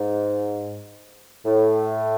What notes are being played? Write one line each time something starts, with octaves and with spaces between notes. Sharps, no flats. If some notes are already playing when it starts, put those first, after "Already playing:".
Already playing: G#2
A2